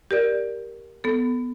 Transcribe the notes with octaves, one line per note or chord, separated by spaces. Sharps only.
G4 A#4 D5
B3 A4